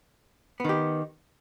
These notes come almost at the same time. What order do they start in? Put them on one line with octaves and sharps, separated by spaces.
B3 D#3 G4